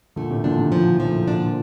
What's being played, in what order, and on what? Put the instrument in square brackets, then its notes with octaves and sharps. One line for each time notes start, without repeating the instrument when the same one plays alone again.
[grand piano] A#2 D3 [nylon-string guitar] A3
[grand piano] A2 C3
[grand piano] A#2 D3 [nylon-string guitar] D4
[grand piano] C3 D#3
[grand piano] A#2 D3 [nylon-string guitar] F3
[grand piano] A2 C3 [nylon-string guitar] F3
[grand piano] A#2 D3 [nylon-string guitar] D4